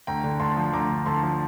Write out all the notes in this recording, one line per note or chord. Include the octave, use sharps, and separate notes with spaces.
D2 G5 A#5
D3
D2 A5 C6
F3
D2 A#5 D6
D3
D2 A5 C6
F3